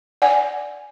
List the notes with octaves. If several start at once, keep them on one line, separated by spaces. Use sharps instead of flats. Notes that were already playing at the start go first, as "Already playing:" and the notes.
D5 F#5 G#5